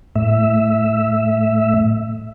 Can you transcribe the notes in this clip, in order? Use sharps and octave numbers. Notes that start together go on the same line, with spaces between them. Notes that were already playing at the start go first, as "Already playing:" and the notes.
A2 E5